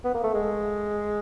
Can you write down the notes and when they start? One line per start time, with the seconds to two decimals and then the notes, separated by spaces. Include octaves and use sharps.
0.05 B3
0.14 A#3
0.24 A3
0.34 G#3